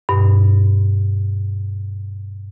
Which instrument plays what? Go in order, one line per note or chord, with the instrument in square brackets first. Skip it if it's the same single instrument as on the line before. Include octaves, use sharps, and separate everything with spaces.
[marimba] G2 B2